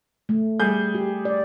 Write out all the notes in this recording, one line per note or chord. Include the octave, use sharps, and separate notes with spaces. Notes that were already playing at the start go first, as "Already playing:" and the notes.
A3
G3 G#4 G6
G4
D5